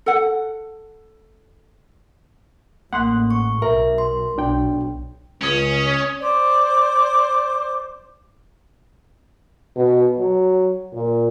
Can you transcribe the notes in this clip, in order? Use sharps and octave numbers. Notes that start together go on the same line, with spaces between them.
A4 F#5
A1 A#3 F#5 C6 F#6
C#6
B1 A#4 E5
C6
B1 D4 G5
C#2 C#4 D#6
C5 D5 D6
B2
F#3
A#2